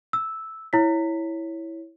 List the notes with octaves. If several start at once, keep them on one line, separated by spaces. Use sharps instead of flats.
E6
E4 C#5 B6